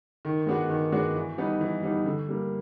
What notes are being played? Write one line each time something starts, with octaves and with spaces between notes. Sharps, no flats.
D#3
G#3 B3 D4 F#4
D#3
G#3 B3 D4 F#4
E3
G3 B3 D#4
E3
G3 B3 D#4
D3
G3 A#3